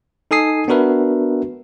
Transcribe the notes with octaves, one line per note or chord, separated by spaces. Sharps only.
D#4 A4 G#5 D#6 C7
B3 D4 F#4 A#4 B4 E5